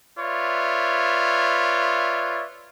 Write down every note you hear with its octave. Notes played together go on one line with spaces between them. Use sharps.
F4 B4 C#5 D5 E5